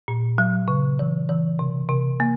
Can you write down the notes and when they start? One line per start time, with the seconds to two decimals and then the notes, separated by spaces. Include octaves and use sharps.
0.08 A#2
0.38 F#3
0.68 C#3
0.99 E3
1.29 E3
1.59 C3
1.89 C3
2.20 A#3